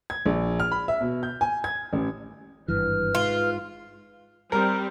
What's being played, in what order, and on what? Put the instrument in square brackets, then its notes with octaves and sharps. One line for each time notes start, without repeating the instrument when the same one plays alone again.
[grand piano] G#6
A#1
F6
B5
E5
B2
G6
G#5
G#6
A1
[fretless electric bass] G#1 G2 E3 [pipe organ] B4 F6
[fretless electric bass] G#2 [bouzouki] F4
[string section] G3 C4 [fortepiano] A#4